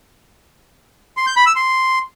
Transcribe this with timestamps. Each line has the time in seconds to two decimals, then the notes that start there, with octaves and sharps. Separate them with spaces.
1.17 C6
1.27 G6
1.36 B5
1.46 E6
1.56 C6